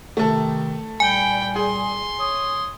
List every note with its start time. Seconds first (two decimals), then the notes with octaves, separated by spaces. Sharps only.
0.17 C3 D#3 A3 A4
1.00 C2 A#2 G3 G5 G#5 B5
1.56 G#4 C6
2.19 C#5 D#6